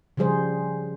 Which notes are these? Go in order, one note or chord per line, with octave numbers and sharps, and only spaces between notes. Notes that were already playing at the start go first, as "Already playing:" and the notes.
C#3 F3 G3 G#4 C5